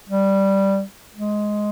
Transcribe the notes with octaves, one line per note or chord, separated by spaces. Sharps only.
G3
G#3